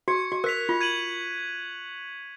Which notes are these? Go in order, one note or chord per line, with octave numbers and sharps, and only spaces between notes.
F#4 C#6 G#6 C#7
F#4
A#4 F#6 B6 F7
F4
G#6 D#7 F#7